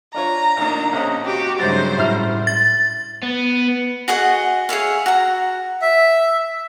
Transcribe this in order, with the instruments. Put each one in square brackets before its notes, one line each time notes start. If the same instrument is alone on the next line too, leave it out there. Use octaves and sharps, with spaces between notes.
[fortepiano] D4 F4 C#5 [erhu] A#5
[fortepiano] A1 D3 D#4 [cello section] A#3 D4
[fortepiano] A#1 C4 D#5 [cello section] C#4
[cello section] F#4 [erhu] G4
[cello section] G2 C#3 G#3 [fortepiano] F#3 C4 E4 [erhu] C5 [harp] A6
[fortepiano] F#2 G3 [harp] A2 C6 F6
[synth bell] A6
[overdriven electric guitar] B3
[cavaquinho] F#4 G#4 D#5 F#5
G#4 C#5 E5 F5
F#4 A#5
[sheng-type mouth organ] E5